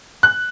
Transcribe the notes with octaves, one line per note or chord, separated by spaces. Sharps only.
F#6